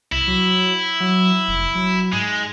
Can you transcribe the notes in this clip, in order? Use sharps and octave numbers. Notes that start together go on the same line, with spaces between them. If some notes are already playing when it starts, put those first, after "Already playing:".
C2 E4
F#3
F#3
F1
F#3
G#2 G#3